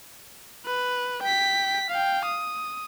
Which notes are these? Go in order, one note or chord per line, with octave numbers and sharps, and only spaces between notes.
B4
G5 B6
F5 G5
D#6